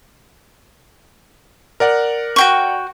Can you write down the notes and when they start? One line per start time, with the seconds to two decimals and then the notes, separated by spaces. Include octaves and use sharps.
1.80 A#4 D5 F#5
2.36 F#4 G5 C#6